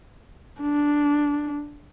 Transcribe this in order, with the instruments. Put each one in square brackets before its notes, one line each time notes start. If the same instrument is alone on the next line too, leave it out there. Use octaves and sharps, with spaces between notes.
[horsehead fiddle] D4